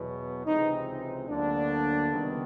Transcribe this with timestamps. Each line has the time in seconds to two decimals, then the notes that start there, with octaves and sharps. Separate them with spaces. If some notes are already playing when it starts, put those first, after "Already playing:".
Already playing: E2 B2 F#3 B3
0.45 C#2 C3 E3 G#3 C4 D#4
1.28 D2 D3 F#3 A#3 D4
2.10 C#2 C3 D#3 G3 B3